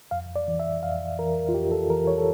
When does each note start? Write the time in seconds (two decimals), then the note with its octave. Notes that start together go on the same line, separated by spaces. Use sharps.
0.11 F2 F5
0.36 D5
0.48 E3
0.60 E5
0.83 F2 F5
1.19 E3 A#4
1.49 F4
1.54 F2 G4
1.72 A4
1.90 E3 A#4
2.07 C#5
2.18 A4